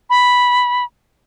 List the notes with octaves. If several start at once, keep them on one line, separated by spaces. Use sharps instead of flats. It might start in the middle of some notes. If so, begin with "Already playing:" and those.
B5